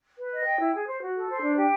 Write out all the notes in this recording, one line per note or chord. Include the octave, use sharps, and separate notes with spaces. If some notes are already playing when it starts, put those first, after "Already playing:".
B4
D#5
G5
E4
G#4
C5
F#4
A4
C5
D4
G4